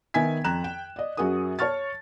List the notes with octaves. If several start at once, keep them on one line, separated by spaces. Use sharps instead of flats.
D#3 B3 E5 G#5 G#6 B6
F2 A#5 F#6 E7
G5
D5 D#5
F#2 F#4 G#4 A#4 D#6
C#5 A5 C#6 F6 A6